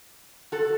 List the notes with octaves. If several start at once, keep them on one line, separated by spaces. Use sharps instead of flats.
F#4 A4